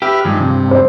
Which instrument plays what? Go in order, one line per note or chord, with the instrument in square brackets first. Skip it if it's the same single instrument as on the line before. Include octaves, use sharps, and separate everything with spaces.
[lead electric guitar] G4 [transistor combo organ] B4 E5 F6
[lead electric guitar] G2 [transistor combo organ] D#3 F3 G#3
[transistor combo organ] C3
[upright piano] C5